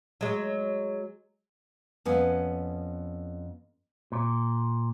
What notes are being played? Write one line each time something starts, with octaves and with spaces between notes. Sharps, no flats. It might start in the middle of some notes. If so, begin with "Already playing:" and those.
F#3 G#3
F2 B3 C#4
A#2